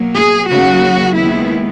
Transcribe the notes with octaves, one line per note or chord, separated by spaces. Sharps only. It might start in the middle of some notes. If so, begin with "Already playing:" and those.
Already playing: B2 F#3 A#3
G#4
D#2 C#3 F#3 F#4
D#2 D#3 G#3 B3 E4